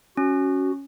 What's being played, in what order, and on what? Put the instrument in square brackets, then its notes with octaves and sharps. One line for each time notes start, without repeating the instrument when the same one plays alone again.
[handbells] C#4 [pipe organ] F#4